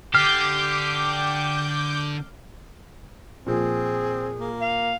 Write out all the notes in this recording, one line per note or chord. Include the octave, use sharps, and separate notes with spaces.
D3 G4 D6 F6 G6 C7
A#2 F3 C4 G#4
A#3
F5